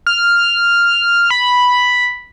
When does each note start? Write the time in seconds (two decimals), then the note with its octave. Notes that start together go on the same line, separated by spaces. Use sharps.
0.07 F6
1.30 B5